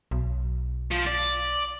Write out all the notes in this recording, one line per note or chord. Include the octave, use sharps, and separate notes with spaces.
B1
F3
D5